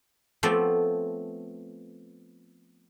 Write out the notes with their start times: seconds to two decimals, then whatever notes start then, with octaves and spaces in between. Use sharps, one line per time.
0.43 F3 A3 B3 C4 D5